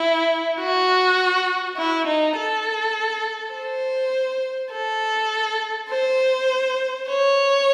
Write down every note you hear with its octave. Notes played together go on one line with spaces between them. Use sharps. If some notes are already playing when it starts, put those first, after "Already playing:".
Already playing: E4
F#4
E4
D#4
A4
C5
A4
C5
C#5